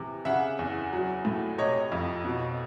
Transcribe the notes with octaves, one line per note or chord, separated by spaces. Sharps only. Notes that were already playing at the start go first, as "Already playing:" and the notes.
Already playing: C3 E3
C#3 E5 F#5
E2
F#3
A2
C3 C#5 D#5
F2
B2